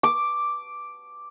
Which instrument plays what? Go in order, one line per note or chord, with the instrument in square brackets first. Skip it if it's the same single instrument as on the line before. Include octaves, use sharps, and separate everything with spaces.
[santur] D6